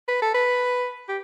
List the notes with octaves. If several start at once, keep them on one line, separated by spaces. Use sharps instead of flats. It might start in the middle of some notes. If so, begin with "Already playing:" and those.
B4
A4
B4
G4